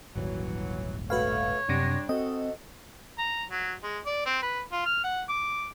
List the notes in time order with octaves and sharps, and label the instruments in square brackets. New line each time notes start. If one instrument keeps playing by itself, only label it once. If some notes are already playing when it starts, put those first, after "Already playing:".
[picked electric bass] D#1 G#1 [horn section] E3 F#3
[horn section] B2 A3 [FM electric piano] F#4 B4 F5 [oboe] C#5
[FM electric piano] F#2 C3 A#6 [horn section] G3 D4
[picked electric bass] C4 [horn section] F#4 A4 [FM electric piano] D#5
[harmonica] A#5
F#3
G#3
D5
C4
B4
F4
F6
F#5
D6